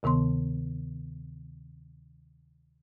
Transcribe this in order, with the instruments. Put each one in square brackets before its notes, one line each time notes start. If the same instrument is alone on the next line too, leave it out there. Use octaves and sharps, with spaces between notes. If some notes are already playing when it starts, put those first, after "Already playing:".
[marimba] D2 C3 D#3 B3 C6